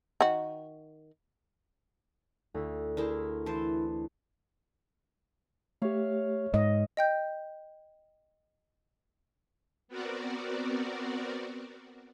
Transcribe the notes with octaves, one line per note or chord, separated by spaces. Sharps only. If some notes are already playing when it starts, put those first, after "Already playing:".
D#3 F#4
D2 E4
D4 E4 G#4 A#4 C5
E3 E4 C5 A5 A6
A3 G4 C#5 E5 F5
G#2 D#5
D#5 G5 G6
B3 C4 F#4 A#4 D5